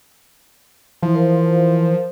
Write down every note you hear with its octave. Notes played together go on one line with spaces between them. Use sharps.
E3 F3
A#4 C5